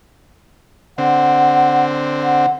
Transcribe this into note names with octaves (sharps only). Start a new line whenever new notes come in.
D3 C4 F#5
F#5